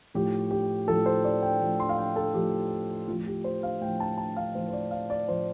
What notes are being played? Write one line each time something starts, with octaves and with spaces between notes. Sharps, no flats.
A2 F3 G4
G4
A2 F3 A4
C5
D5
G5
A2 F3
C6
F5
G5
A4
A2 F3 G4
A2 F3 F4
G4
C5
F5
A2 F3 G5
A5
A5
F5
A2 F3 C5
C5
D5
F5
D5
A2 F3 C5